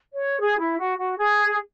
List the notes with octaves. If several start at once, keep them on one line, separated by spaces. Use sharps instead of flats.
C#5
G#4
E4
F#4
F#4
G#4